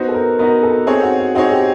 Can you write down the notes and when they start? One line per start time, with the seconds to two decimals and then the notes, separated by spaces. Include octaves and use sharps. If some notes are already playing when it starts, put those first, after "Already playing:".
Already playing: B3 D#4 F#4 C5
0.08 A4
0.14 A#4
0.39 B3 D#4 F#4 A#4
0.63 A4
0.87 C4 D#4 G#4 A4 C#5
1.03 F#4
1.20 F#4
1.35 C4 D#4 F#4 G#4 C#5
1.52 G4